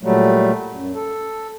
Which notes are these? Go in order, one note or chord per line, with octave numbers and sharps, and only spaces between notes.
A#2 F#3 G3 A3
F#2
A4